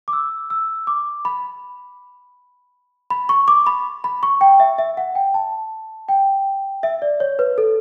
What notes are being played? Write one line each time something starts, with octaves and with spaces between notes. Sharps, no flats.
D6
E6
E6
D6
B5
B5
C#6
D6
B5
B5
C#6
G5
E5
E5
F#5
G5
A5
G5
E5
D5
C#5
B4
A4